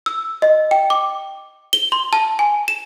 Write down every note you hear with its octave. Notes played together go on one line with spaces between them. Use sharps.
E6
D#5
G5
D6
G7
C6
A5
G#5
E7